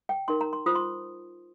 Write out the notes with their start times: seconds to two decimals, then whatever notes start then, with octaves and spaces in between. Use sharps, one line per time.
0.09 G5
0.28 D#4 A#4 C6
0.41 A#5
0.53 C6
0.66 F4 C5 D#6
0.75 C6